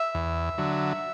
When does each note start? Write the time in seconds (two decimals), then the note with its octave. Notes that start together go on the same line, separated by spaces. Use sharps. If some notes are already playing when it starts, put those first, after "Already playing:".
Already playing: E5
0.14 E2
0.58 D3 F#3